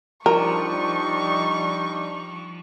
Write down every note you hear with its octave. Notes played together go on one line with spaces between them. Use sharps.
F3 G3 D4 D#4 A#4 C#6